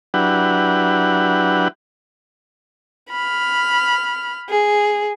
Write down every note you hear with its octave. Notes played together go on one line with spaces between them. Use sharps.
F#3 D4 E4 G4 B4 F#5
B5 F6
G#4